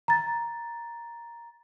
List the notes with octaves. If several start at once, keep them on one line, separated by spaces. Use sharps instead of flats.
A#5 A6